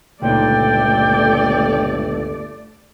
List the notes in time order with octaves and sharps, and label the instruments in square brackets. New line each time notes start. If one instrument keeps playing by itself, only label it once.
[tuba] G1 [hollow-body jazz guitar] C#2 A#2 D#4 [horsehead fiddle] A3 D5 [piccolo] G5